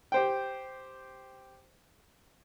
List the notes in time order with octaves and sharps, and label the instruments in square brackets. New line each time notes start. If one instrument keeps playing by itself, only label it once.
[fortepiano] G4 C5 G5